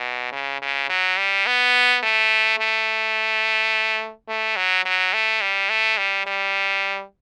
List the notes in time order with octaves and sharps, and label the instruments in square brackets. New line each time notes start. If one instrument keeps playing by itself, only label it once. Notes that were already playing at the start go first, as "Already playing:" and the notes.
Already playing: [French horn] B2
C#3
C#3
F#3
G3
B3
A3
A3
A3
F#3
F#3
A3
G3
A3
G3
G3